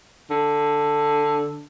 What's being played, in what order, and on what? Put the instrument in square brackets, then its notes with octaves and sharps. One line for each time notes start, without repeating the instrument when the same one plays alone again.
[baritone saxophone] D3